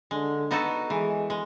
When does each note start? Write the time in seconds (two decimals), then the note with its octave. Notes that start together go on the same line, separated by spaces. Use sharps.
0.11 D3 G#3
0.51 B3 D#4 F#4 A4
0.90 E3 G#3
1.30 G#3